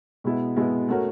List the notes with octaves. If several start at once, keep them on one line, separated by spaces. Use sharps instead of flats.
B2 G#3 B3 E4
B2 G#3 B3 E4
A3 C#4 F#4 A#4